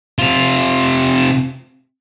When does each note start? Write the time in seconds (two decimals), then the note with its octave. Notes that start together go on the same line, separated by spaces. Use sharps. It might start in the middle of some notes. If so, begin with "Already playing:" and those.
0.19 C3 F4